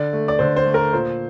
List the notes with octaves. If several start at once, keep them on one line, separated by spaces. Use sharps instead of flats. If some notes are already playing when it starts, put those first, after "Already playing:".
Already playing: D3 D5
A3
D5
D3 C5
C5
A3
A#4
A#2 C5